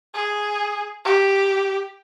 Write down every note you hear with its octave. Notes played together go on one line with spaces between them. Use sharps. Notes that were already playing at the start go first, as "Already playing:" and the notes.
G#4
G4